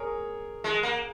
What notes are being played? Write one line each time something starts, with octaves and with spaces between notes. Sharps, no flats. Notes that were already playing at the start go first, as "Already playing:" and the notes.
Already playing: G#4 A#4 C#5
G#3
A#3